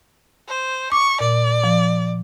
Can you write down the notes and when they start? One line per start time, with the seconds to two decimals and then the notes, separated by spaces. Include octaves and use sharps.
0.48 C5
0.92 C#6 D6
1.20 A#2 D5
1.64 F3